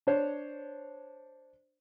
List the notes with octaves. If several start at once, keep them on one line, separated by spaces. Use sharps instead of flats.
D4 C5 C#5